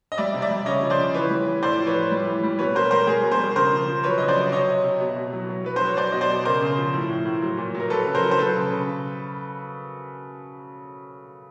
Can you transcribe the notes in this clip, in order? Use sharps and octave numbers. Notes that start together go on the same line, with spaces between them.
D#5
G3 D5 E5
C3
D5 E5
G3
C#3 C#5 D#5
F3
C5 D5
C#3
E3 B4 C#5
G3
E3
A2 C5 D5
F3
B4 C#5
F3
G3
E3
G3
B2 B4 C#5
B2 A#4 C5
G3 A#4 C5
G3 G#4 A#4
B2
A#4 C5
G3
C#3 A#4 C5
F3
F3
F#3 B4 C#5
C#3 D#5
C5 D5
F#3
C3 C#5 D#5
C3
C3
B2
B2
F#3
F#3
F#3 B4
C5
F#3
C#5
F#3 C5 D5
B2 D#5
C5 D5
B2
C#3 A#4 C5
C#3
F3
A2
A2
A2
F#3
A#2
F#3
A#4
F#3 A4 B4
C#3
A#4 C5
F#3
C5
F#3 A4 B4
C#3
C#3